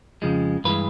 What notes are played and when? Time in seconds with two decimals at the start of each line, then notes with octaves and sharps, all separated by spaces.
0.22 F2 C#3 F3 G#3
0.64 G2 E3 G#3 B4